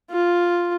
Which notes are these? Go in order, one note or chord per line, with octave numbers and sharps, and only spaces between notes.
F4